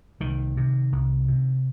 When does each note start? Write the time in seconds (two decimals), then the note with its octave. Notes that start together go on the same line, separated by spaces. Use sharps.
0.20 C2 D#3
0.57 C3
0.92 C2
1.28 C3